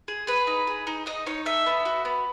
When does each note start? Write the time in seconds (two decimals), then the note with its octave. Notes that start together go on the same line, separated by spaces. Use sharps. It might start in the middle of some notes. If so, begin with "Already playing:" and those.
0.08 G#4
0.27 G#4 B4
0.47 D#4
0.67 G#4
0.87 D#4
1.06 D#4 D#5
1.26 D#4 C#5
1.46 A4 E5
1.66 B3
1.85 F#4
2.05 B3